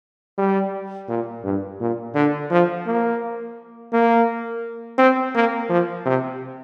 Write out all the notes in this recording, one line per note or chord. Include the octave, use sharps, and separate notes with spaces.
G3
A#2
G2
A#2
D3
F3
A#3
A#3
C4
A#3
F3
C3